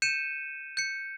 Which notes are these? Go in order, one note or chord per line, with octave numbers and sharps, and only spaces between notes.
G6 C#7 D#7 E7
G6 C#7